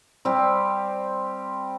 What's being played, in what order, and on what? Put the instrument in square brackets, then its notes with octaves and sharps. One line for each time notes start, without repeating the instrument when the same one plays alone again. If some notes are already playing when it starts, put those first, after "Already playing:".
[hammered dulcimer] G3 C4 G4